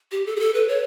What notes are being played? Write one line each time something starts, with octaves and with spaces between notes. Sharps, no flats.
G4
A4
G#4
A4
B4
C#5